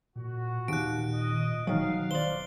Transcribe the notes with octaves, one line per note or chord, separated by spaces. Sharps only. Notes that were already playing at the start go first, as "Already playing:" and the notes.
A#2 F#4
D#2 A#2 F#6 D7
D#5
E1 D#3 F#3 F5
C5 D5 F#7 G7